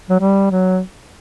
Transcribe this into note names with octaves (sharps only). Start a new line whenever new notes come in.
F#3
G3
F#3